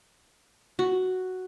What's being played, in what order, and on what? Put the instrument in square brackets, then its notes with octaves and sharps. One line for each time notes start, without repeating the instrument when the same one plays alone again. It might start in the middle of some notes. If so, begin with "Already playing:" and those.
[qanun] F#4